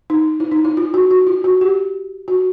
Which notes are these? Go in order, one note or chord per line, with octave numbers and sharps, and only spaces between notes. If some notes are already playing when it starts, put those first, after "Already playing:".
D#4
E4
D#4
E4
F4
F#4
F#4
F4
F#4
G4
F#4